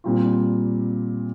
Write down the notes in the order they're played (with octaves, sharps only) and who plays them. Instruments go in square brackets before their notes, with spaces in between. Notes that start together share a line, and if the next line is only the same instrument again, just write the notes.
[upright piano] A#2 G3 C4 F4